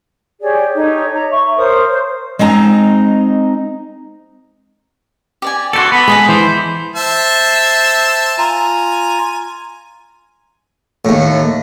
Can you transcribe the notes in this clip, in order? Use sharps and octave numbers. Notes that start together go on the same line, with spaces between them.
G4 G#4 C#5 D5
D#4 G4 A4 C#5
C#5 A#5
E5 C#6
A#4 C5 C#5 D#6
C5
G#3 C4 D#4 G#5 A#5
G4 D5 G#5
F#4 G4 A4 D5 C6
B3 B5
G#3 G#4 D#5 A5
E3 C5
C5 E5 A5
F4 G#5 A#5
D#2 A2